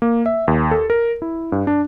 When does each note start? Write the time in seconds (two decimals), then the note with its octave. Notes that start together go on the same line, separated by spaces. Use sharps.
0.02 A#3
0.26 E5
0.48 D#2
0.71 A4
0.90 A#4
1.22 E4
1.52 G2
1.67 D4